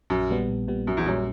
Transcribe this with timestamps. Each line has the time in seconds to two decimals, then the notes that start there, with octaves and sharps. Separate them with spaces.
0.10 A#1 F#2
0.30 A#2 G3 B3
0.49 A#1
0.68 A#2 G3 B3
0.87 A#1 F#2
0.97 E2
1.06 F#2 A#2 G3 C#4